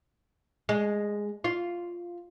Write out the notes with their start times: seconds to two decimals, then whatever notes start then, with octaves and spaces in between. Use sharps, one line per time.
0.69 G#3
1.44 F4